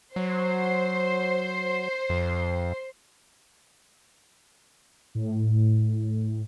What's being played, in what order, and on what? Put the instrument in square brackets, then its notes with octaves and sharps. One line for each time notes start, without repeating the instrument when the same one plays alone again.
[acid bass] F#3 [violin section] C5 C6
[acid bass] F2
[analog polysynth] A2